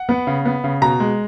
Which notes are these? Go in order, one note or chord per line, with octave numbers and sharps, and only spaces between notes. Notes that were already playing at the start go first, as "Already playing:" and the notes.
Already playing: F#5
B3
C#3
B3
C#3
B2 A#5
G#3